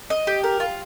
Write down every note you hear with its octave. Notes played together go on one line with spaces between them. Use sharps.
D#5
G4
A#4
F4